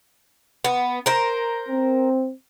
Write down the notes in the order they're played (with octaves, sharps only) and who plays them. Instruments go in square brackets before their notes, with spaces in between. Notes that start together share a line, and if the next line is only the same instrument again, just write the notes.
[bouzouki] B3
A#4 C5
[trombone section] C4